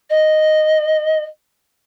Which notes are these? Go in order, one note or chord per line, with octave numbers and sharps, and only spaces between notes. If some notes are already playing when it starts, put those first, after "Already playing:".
D#5